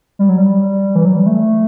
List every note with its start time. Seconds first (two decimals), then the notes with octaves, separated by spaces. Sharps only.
0.19 G3
0.29 F#3
0.38 G3
0.95 E3
1.05 F#3
1.15 G3
1.26 A3